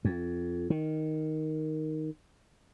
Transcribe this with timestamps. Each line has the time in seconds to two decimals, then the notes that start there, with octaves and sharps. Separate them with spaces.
0.05 F2
0.70 D#3